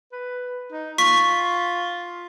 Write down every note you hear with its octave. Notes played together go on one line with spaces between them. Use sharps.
B4
D#4
F4 C#6 B6